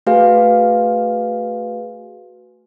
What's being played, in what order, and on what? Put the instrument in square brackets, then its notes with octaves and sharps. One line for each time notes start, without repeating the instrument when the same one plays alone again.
[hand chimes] A3 F#4 G#4 B4 F5 G#5